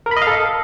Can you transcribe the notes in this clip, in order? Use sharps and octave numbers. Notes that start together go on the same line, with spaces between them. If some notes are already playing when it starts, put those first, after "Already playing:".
A#4
B5
D#5
F5
A4